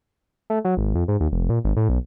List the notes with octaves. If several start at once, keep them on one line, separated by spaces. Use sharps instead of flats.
A3
F#3
G#1
F2
G#2
D#2
F1
A#2
G#1
A2
B1